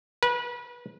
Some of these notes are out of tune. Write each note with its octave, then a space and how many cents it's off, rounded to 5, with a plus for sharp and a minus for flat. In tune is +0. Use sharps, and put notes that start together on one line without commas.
B4 -30